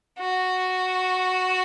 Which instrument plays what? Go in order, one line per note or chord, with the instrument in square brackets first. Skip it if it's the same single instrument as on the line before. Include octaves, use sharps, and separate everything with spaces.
[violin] F#4